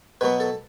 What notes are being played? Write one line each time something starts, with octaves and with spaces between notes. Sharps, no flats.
B2 F#3 B3 B4
A4